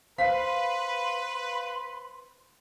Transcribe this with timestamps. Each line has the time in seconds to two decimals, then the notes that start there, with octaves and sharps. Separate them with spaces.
0.18 B4 C5 F5 C6 B6